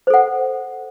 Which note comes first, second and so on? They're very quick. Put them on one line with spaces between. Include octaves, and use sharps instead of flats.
C5 A4 F#5